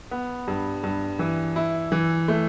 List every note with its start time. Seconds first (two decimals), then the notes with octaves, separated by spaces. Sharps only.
0.11 B3
0.48 G2
0.84 G2
1.19 E3
1.56 E4
1.92 E3
2.28 A3